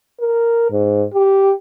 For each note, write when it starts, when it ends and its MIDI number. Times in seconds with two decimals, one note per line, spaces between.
0.21 0.70 70
0.71 1.05 44
1.14 1.51 67